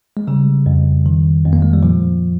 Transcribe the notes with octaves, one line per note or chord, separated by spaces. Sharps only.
G#3
C#3 G3
F2
D#3
F2
A#3
G#3
G3
A#2 F3